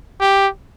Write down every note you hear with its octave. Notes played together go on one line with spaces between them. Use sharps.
G4